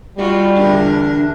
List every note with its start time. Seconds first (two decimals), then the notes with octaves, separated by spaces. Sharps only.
0.18 G3 D#4 F4 F#4
0.56 E2 D3 D4 A#4